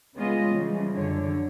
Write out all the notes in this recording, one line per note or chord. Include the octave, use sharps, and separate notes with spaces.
C#3 G#3 B3 C#4 F4 D#5
C#3 E3 F3 G3
F#2 D3 C#5